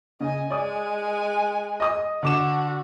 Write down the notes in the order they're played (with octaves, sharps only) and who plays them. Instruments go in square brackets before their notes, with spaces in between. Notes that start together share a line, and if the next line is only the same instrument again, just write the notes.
[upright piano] C#3 [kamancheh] D#5 G#5
[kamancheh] G#3 G#5 [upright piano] D5 D#6
[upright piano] D#5 D#6
[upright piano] D3 D6 E7 [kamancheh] F#4